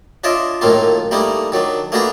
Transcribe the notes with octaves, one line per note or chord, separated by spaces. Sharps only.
D4 F4 C#5 D#5 E5 D6
F#2 A2 D#3 A3 A#3 F4
G3 A3 A#3 D#4 E4
D#3 F#3 D4
A3 A#3 D4 F#4 G#4 B4